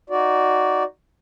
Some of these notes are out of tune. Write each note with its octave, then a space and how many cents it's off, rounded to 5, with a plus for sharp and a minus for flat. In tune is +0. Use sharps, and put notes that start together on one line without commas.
D#4 +0 F#4 +0 D5 -10